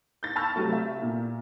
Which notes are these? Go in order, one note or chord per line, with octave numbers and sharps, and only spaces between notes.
G6 A6
A5 B5 C#6 E6 F6 A6
C3 F#3 A3
E5
A#2